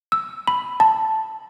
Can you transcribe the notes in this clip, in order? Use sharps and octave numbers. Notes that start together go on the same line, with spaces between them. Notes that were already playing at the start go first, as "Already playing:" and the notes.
E6
B5
A5